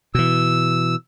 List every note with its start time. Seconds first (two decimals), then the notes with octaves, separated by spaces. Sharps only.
0.15 B2 E3 E6